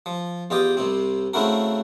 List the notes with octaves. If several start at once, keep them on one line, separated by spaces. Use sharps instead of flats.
F3
E2 F4 G4 D#5 G5
C2 C3 C4
C#3 A3 C4 E4 F#4 A#4